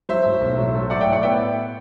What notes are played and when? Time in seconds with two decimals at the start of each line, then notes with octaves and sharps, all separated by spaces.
0.09 F#3 C5 E5
0.25 A2
0.41 B1
0.58 F#3
0.74 A3
0.90 F#3 D5 F#5
1.01 E5 G5
1.07 A2
1.12 D5 F#5
1.23 B3 E5 G5